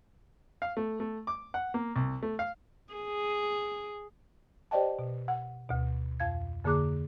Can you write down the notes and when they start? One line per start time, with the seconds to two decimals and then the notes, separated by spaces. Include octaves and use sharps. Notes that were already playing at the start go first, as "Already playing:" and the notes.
0.62 F5
0.77 A3
1.00 A3
1.27 D6
1.54 F#5
1.74 A#3
1.96 C2
2.23 A3
2.39 F5
2.94 G#4
4.71 G4 C5 D5 D#5 G5 A5
4.99 B2
5.28 F#5
5.69 D2 B2
6.20 F2 F5 G#6
6.64 F2 D3 A#3 G#4 D6 F#6